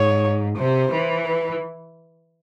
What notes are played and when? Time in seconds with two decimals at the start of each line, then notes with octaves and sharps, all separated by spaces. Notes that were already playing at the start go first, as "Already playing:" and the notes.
Already playing: G#2 C#5
0.57 C3 C5
0.92 E3
1.25 B4